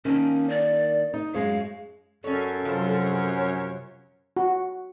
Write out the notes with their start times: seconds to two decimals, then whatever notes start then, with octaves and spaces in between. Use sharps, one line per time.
0.05 D#3 A#3 C#4 D4
0.49 D5
1.14 D#4
1.34 F#2 G#3 C#5 F5
2.24 F#2 C#4 A4 C#5
2.65 C3 F3 F#3 C5
3.37 C#5
4.37 F#4